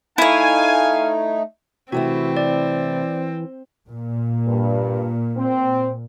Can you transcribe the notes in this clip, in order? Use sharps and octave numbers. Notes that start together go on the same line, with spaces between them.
A3 D#4 E4 C#5 F5 G#5
C3 E3 A3 C4 E4 F#4
D5
A#2
G2
C4